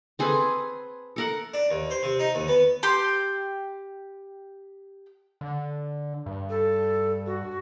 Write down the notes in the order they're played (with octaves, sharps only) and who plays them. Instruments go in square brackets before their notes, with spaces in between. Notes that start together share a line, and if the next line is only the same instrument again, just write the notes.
[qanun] C4 G#4 A4 B4
A4 A#4 F#5
[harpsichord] D4
D#2
C5
C3
D#4
D#2
B3
[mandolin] G4 C6
[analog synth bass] D3
G2
[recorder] A4
F#4